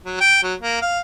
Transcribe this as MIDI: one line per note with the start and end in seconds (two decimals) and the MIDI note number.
0.05 0.16 54
0.21 0.40 79
0.43 0.54 54
0.62 0.79 58
0.81 0.99 77